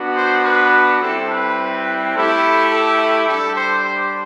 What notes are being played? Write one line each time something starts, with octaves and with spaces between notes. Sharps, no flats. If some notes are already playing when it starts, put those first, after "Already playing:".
Already playing: B3 D4 F#4
C5
B4
G3 C4 E4 A4
B4
A3 E4 G4 A4
A4
A4
G3 D4 G4 A4
C5
C5